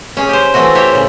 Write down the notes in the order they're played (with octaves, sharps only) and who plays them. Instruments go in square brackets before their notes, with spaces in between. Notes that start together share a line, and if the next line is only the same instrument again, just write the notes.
[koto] C#4 G#4
G4 C5
E3 A3 C4 F#4
E4 G4 C5 C#5
A2 C#3